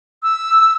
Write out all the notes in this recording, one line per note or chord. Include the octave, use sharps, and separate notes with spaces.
E6